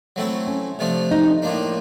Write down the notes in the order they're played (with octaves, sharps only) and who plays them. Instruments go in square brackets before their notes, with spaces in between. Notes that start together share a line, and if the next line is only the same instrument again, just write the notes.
[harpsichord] F#3 A3 C4 E4
[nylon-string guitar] C#4
[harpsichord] C3 F3 A3 D4
[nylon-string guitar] D#4
[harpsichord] A2 F3 A#3 D4